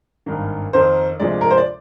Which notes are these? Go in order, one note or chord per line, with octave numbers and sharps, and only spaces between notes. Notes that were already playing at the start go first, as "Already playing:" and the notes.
G#1 G2 D#3 A#3
F2 D#3 A#3 C5
D2 C3 F3 G#3 D5
A#4
C5
D5